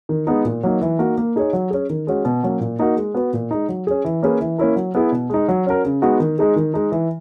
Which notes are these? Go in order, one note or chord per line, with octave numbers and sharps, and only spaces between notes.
D#3
G#3 B3 D#4
A#2
F#3 A#3 D#4
E3
A#3 D#4 F#4 A#4
A#3
D#4 G#4 C#5
F#3
C#4 G#4
D#3
G#3 C#4 F#4
B2
F#3 A#3 C#4
A#2
A#3 D#4 F#4 A#4
G#3
B3 F#4 B4
A#2
G#3 D#4
F#3
C#4 G#4
E3
A#3 C#4 G#4 B4
E3
A#3 C#4 E4 A#4
F#3
B3 E4 G#4
B2
G#3 D#4
F#3
C#4 F#4 A#4
C#3
G#3 B3 D#4 F#4
D#3
G#3 D#4 G#4
D#3
G#3 D#4
E3